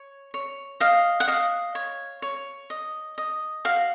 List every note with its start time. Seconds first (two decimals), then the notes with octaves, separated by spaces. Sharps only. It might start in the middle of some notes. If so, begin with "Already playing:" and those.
Already playing: C#5
0.34 C#5
0.80 D#5 F5
1.20 F#5
1.28 D#5 F5
1.75 C#5
2.22 C#5
2.70 D#5
3.18 D#5
3.65 F#4 F5